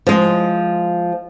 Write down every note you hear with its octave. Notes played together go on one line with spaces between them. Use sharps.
F3 G#3